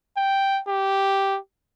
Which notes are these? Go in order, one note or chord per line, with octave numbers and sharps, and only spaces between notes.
G5
G4